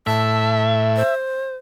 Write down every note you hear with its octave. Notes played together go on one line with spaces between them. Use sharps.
A2 E5 A5
C5